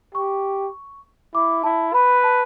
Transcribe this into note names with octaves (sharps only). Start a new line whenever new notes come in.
G4 C#6
E4 D6
E4 A5
B4 B5
A5